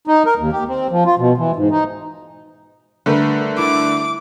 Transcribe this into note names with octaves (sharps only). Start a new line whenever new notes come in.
D#4
A#4
D#2
G4
C4
F3
F4
B2
E3
G#2
D#4
D3 G3 A3 A#4 B4
E4 D6